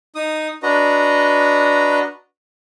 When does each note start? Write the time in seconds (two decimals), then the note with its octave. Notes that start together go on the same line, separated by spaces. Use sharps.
0.15 D#4 D#6
0.63 D4 F#4 B4 D#5 A#5